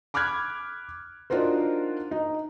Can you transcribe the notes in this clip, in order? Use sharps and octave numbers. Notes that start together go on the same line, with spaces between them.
B5 D6 F6 F#6 G#6
D4 D#4 F4 F#4 A#4 C5
D#4